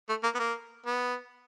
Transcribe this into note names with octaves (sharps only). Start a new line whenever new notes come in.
A3
A#3
B3
A#3
B3